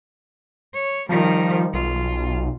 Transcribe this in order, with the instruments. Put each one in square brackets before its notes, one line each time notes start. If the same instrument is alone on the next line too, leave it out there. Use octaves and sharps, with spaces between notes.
[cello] C#5
[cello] D#3 G3 [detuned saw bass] F3
[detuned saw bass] B1 [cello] F4